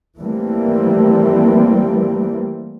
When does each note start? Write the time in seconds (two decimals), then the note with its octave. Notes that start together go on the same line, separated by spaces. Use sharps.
0.18 E3 G3 A3 A#3 C4